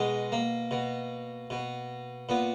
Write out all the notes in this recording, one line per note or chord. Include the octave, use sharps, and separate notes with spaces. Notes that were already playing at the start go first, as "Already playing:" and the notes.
Already playing: B2 G#3
A#3
B2
B2
A#2 B3